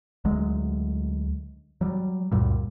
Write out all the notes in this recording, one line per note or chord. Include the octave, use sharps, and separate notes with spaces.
D2 F#3 G#3
F#3 G3
C#2 F#2 A#2 G3